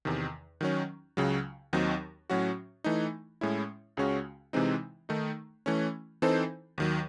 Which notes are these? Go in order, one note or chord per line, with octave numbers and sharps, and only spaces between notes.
E2 C3 D#3
D#3 F#3 C#4
C#2 C#3 F#3
D#2 D#3 F#3 C4 D#4
A2 F#3 C#4 F#4
E3 A3 D#4
A2 G#3 C#4 E4
C#2 C#3 G#3 C#4 F#4
C3 E3 G#3 C4 D#4
D#3 A3 D#4
E3 A3 C#4
E3 C4 D#4 A4 C5
D#2 D#3 F#3